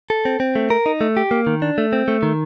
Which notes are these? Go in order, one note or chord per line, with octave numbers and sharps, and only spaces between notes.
A4
C4
C4
A3
A#4
D#4
A3
G4
A#3
D#3
D4
A3
C4
A3
D#3